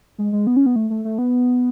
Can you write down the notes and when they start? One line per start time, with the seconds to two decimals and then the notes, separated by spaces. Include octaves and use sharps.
0.18 G#3
0.32 G#3
0.47 B3
0.56 C#4
0.66 B3
0.76 A3
0.90 A3
1.05 A3
1.18 B3